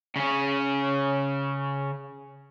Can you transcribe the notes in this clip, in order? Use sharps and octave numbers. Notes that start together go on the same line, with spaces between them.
C#3 C#4